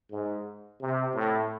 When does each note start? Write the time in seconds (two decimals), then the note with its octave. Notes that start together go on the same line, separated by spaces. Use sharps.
0.11 G#2
0.80 C3
1.14 A2